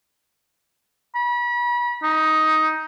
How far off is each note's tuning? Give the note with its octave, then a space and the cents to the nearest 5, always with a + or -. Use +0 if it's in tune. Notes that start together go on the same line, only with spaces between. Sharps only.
B5 -35
D#4 +10